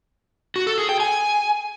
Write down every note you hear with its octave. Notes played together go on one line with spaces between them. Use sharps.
F#4
A4
G#4
G5
G#5